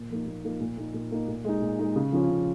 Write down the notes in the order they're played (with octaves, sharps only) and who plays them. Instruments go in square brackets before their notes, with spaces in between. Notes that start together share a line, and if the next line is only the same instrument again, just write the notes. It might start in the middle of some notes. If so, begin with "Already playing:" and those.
Already playing: [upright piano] A#2
F3 A#3 D#4
A#2
F3 A#3 D#4
A#2
A#3 D#4
A#2
A#3 D#4
A#2
G#3 D#4
A#2
G#3 D#4
C#3
F3 C#4 F4
C#3